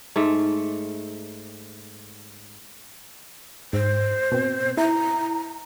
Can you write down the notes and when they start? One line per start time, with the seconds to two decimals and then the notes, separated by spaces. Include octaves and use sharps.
0.16 G#2 A3
3.73 G#2 C5
4.32 B2 C4
4.77 E4 A#5